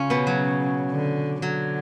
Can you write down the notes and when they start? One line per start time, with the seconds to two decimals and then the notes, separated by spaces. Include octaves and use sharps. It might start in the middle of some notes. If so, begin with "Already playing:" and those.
Already playing: C#3 C#4 F4
0.10 B2 B3
0.27 F#3
0.92 D3
1.42 D3 F#3